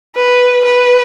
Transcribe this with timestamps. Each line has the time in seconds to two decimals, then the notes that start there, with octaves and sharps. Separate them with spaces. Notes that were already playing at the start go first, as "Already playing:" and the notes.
0.16 B4
0.65 B4